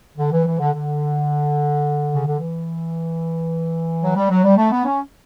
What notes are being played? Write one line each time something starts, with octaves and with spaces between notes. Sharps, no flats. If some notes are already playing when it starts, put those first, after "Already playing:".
D3
E3
E3
D3
D3
C#3
D3
E3
F#3
G3
F#3
G3
A3
B3
C#4